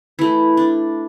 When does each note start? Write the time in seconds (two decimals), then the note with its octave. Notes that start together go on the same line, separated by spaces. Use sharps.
0.19 E3 A3 E4
0.57 D4